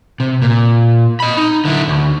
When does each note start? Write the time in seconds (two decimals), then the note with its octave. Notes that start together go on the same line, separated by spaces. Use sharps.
0.20 C3
0.42 A#2
1.20 D#5 B5
1.37 D#4
1.65 D3 E4
1.88 D2